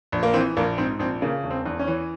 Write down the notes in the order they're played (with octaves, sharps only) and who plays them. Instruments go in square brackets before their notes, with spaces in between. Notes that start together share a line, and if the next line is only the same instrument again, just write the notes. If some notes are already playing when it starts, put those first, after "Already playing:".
[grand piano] A#1
A#3
E3 C4
A#1 A#3
G#2 C4
A#1 C4
C#3 A#3
E1
C4
E2
C#4
E3